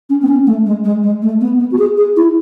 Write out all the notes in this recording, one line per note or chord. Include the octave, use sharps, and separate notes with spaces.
C#4
B3
C#4
A3
G#3
G#3
G#3
A3
B3
B3
F#4
G#4
G#4
E4